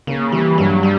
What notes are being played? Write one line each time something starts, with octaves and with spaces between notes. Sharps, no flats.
C#3 A#3
E3 G3
G2 F#3
G3